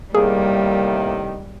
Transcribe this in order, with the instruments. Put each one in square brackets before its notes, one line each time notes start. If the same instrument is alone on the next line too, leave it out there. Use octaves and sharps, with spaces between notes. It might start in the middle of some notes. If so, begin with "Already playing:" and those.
[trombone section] A2 C3 D#3 [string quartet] G3 [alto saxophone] A#3 [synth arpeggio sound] G#4